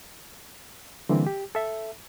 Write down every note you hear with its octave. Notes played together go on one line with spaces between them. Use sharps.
D3 E3 G3 A#3 C4
G4
A4 E5